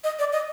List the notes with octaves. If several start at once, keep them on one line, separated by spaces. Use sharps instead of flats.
D#5
D5
D#5